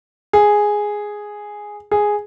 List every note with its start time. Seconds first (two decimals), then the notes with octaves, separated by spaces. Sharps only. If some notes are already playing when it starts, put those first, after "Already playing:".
0.33 G#4
1.91 G#4